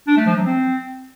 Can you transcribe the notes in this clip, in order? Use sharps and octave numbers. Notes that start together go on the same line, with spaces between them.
D4
A3
F3
F#3
C4